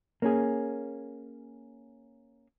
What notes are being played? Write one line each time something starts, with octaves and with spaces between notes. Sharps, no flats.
A#3 C#4 G#4